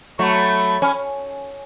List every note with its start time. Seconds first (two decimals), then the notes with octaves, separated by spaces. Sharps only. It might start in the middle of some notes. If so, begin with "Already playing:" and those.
0.19 F#3 A3 B5 C#6
0.82 C#4